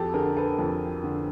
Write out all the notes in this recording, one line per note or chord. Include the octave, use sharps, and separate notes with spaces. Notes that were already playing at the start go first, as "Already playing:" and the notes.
Already playing: F2 F#4 G4 A4
D3 G#4 A#4
A4 B4
F2
D3